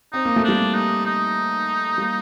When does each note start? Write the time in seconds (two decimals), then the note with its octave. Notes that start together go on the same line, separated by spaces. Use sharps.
0.13 C4 D#4
0.25 A#3
0.36 A3
0.44 G3 A#3 D4
0.74 D#4
1.06 D#4
1.98 G3 A#3